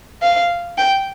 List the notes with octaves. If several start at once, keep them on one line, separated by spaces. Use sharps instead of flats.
F5
G5